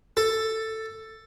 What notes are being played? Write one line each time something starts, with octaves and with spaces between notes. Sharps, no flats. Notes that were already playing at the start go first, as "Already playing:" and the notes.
A4